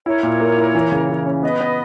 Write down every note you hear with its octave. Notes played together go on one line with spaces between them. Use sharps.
E4 A#4 C#5
A#2
A#3
E4
E3
C#3
E3
C#4
B3 B4 D#5
B3